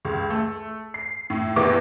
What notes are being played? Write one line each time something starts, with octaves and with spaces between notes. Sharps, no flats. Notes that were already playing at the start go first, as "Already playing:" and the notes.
C#2
A3
C7
A2
E2 A#2 B3 E4 D6